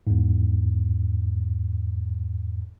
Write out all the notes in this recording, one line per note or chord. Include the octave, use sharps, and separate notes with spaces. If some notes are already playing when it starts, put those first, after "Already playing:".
E2 G#2